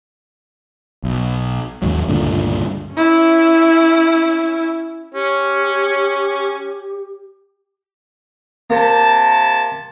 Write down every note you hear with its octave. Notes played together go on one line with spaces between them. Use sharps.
B1
D#2 G#2 F#3
C#2 G2 A#2 D3
C#4 E4
C#4 G4
C3 A#3 A5